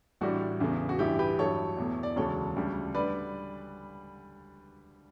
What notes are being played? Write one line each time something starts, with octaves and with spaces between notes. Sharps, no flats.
A1 A2 G3 D4 F#4
E2 C#3 E3 A3
F#4
A1 G2 E3 E4 G4
G4 B4
A1 G2 F#3 A3 A4 C#5
E2 B2 A3
D5
E1 D2 C#3 F#3 A4 C#5
D2 C#3 G3
D3 G3 B4 D5